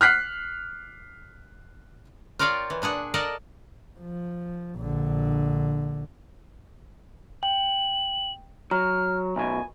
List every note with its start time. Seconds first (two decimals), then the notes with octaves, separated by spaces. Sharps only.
0.01 F6 F#6 B6 C7
2.39 F4 A#4 C#5 D5 F5 G5
2.70 E3
2.82 A#2 D4 G#4 F#5
3.14 A4 A#4 D5 D#5 F#5 A5
4.00 F3
4.78 A#1 D3
7.43 G5 F#7
8.71 F#3 A#5 F6
9.36 B1 F#2 B2 G#5